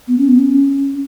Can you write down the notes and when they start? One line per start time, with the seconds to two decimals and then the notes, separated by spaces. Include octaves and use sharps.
0.08 B3
0.18 C#4
0.28 B3
0.39 C#4